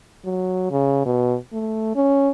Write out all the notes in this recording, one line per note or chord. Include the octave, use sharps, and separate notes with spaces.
F#3
C#3
B2
A3
C#4